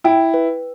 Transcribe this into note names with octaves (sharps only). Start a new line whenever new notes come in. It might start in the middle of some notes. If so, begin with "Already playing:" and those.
E4 G5
B4